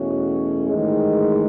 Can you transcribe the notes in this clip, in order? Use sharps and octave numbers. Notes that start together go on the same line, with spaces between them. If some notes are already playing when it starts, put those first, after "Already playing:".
Already playing: E2 B2 A3 C#4 F#4
A1 G#2 D#3 G#3